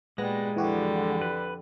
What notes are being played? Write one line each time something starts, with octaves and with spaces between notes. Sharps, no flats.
A#2 G3 G#3 B3 F#6 A#6
F2 D3 E3 G3 F#4 G4
B4